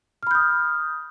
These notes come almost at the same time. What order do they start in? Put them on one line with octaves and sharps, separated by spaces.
F6 B5 G6 D#6